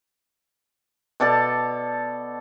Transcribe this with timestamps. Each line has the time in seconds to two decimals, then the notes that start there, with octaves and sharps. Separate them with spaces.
1.20 B2 A4 D5 A5